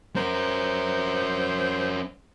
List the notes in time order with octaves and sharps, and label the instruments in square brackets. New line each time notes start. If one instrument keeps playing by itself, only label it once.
[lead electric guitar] C#4 A#4 [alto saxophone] C5